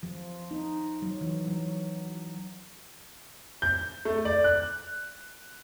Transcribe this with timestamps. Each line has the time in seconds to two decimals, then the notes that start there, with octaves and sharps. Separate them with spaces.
0.03 F3
0.51 D#4
1.02 F#3
1.21 E3
1.47 F#3
3.62 G6
4.05 A3
4.25 D5
4.44 F#6